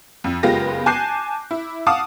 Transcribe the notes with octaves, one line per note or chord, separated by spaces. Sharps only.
F2
F#1 G#3 B3 F4 G4 A#6
G#5 A5 D6 F#6 G6 C7
E4
F5 F#5 A5 D6 D#6